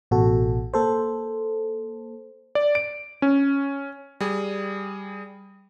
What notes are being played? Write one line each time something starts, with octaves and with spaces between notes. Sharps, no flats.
A1 B2 F#4 A4
A#3 A4 C5
D5
D7
C#4
G3 G#4